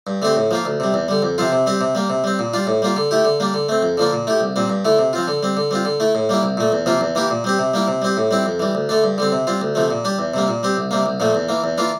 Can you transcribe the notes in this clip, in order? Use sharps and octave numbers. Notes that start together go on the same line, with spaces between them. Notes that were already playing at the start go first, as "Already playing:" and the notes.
G2
D3 A3 C4 G4
A2
F3 A#3 F4
D2
C3 G3
E2
D3 G3
F2
C3 F3 C4 F4
C3
G3 C4 G4
C3
G3 A#3
C3
G3 C4
A#2
G3 D4 F4
A2
G3 A#3 F4
D3
A3 E4 G4
D3
G3 A#3 D4
D3
A3 C4
F2
D3 F3 A#3 D4
A#2
A3 E4 G4
C2
A#2 G3 C4
G2
D3 A3 E4
C3
F3 C4 F4
D3
G3 C4
D3
G3 C4 F4
D3
A3 E4
A2
G3 A#3 E4
C2
A#2 A3
E2
C3 F3 A#3 F4
E2
E3 A#3 E4 G4
A#2
G3 C4 G4
C3
G3 A#3 E4
C3
G3 C4 G4
A2
G3 C4 E4
F2
E3 G3
D2
D3 A3 D4
G2
D3 G3 C4
C3
G3 C4 F4
D2
C3 F3 A3
A#2
G3 D4 G4
E2
C3 G3 A#3
A#2
G3 C4 G4
C2
C3 G3 A#3
C2
A#2 F3 A3
E2
E3 A#3
E2
E3 A#3 D4 F4